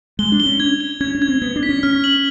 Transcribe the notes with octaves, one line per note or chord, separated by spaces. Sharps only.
G#3 G7
D4
G7
C#4
D4 G#6
G7
C#4 G#6
D4
G#6
C4
B3 G#6
D4
B6
C#4
C#4 F6
F#7